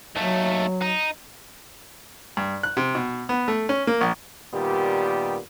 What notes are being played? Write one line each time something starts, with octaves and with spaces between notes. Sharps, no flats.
D#2 F#3 A3
D#4
G2
F#6
C3
B2
B3
A3
C#4
A#3
A#1
A#2 D#3 G3 B3 G4